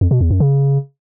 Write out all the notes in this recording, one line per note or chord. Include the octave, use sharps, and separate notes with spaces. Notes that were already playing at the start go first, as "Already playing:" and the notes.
F2
B2
E2
F#2
C#3